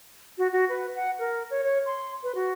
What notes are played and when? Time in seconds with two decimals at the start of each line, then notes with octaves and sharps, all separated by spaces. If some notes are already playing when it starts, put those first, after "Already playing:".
0.38 F#4
0.53 F#4
0.69 B4
0.95 F#5
1.19 A#4
1.50 C#5
1.64 C#5
1.86 C6
2.23 B4
2.35 F#4